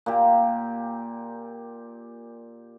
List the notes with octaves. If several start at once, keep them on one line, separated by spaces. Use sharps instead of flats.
A#2 G4